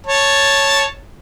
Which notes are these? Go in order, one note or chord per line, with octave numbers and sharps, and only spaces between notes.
C#5 A5